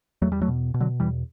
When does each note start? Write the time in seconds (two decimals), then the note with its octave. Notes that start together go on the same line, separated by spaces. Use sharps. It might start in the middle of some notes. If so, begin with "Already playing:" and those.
0.22 E2 F#3 A3
0.32 G3
0.41 F#3 A3
0.48 B2
0.74 B2
0.80 D3 F#3
1.00 E2 E3 G3